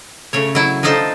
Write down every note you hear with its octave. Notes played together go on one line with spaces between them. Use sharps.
C#3 A3 C#5
F#3 E4
F3 D4 D#4 A4 C5